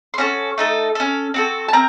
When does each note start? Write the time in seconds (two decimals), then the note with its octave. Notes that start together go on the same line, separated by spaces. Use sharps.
0.14 C6
0.18 C#4 F#4 A4 C#5 C#6
0.58 A3 D#4 A4
0.95 C#4 A4
1.34 C4 F#4 A4
1.68 A5
1.73 C4 A#4 A#5